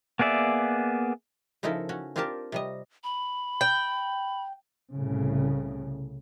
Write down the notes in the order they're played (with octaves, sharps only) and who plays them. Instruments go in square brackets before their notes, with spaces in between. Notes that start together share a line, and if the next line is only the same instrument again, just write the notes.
[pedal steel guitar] A#3 B3 G#4 D5 E5
[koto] C#3 F3 D#4 E4 A4 A#4
C#4 F#4
C4 D4 F4 G4 A#4 A5
C3 G3 D#5
[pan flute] B5
[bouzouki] G5
[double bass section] C2 A2 C#3